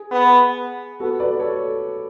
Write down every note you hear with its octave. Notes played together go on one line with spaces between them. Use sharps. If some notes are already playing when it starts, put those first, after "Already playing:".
Already playing: G#4
B3
B3 F#4 A4
B4 D5
A4 C#5